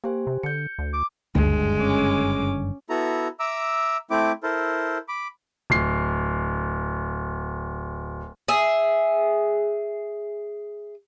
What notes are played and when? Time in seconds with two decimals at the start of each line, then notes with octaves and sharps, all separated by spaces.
0.04 A#3 G4 C5 G#5
0.27 C3
0.43 D3 G6 C#7
0.79 D2
0.93 D6
1.35 F#1 D2 G2 D3 G#3
1.80 C#4 D6
2.90 B3 E4 F#4 A4 A#5
3.39 E5 A#5 D6 E6
4.10 A3 C4 E4 D6
4.43 E4 A4 A#4 C5
5.08 B5 D6
5.70 D1 C7
8.48 G#4 E5